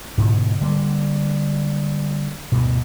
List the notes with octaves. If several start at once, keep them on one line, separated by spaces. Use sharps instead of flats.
G#2 B2 D3
D3 G3 G#3 A#3
D2 G2 B2